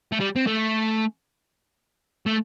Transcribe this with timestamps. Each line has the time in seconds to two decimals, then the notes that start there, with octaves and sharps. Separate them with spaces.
0.12 A3
0.20 G3
0.36 C4
0.47 A3
2.26 A3